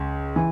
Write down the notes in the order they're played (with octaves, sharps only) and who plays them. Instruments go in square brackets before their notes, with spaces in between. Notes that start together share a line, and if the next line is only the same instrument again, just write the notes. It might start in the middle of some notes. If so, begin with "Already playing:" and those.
Already playing: [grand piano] C#2
E3